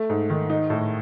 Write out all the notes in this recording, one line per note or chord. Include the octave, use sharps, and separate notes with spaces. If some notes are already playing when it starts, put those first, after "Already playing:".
Already playing: A3
G#2
D#3
D#4
A2